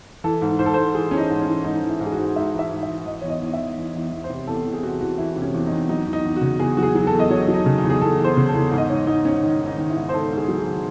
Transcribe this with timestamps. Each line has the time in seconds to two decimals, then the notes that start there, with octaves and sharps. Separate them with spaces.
0.24 E3 A4
0.42 G#2
0.59 G#2 C5
0.66 A4
0.74 G#2 C5
0.94 E3 G#4
1.11 E3 C#4
1.18 D#4
1.30 G#2
1.42 C#4
1.47 E3
1.65 G#2 D#4
1.83 E3
1.89 E4
2.00 G#2
2.06 G#4
2.12 F#4
2.18 G#2
2.36 G#2 E5
2.53 E3
2.59 E5
2.71 G#2
2.83 E5
2.89 E3
3.06 E3 D#5
3.22 E2 C#5
3.29 D#5
3.42 E2
3.53 E5
3.60 E2
3.78 E3
3.95 E2
4.12 E2
4.24 C5
4.30 C3
4.47 E2 A4
4.65 E3
4.73 G#4
4.83 C3 F#4
5.01 E3 F#4
5.18 E3 E4
5.36 C3
5.42 C#4
5.54 E2
5.66 D#4
5.72 E2
5.89 F#3 D#4
6.07 E2
6.13 D#4
6.25 E2
6.36 F#4
6.42 C#3
6.59 E2 G#4
6.77 F#3 F#4
6.83 G#4
6.95 F#3
7.07 A4
7.13 E2
7.19 D#5
7.30 F#3 C#5
7.48 F#3
7.54 D#4
7.66 C#3
7.78 D#4
7.83 E2
7.90 G#4
8.01 E2 A4
8.19 E2
8.24 C5
8.37 C#3
8.48 A4
8.54 E2
8.71 G#2
8.78 D#5
8.89 G#2 C#5
9.07 G#2 D#4
9.24 G#2 C#4
9.42 D#3 D#4
9.61 D#3
9.66 D#4
9.78 D#3
9.89 E4
9.96 G#2
10.09 C5
10.13 G#2 A4
10.31 G#2
10.37 G#4
10.48 F#3
10.60 G#4
10.66 D#3